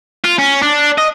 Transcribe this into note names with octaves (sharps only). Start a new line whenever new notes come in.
F4
C#4
D4
D#5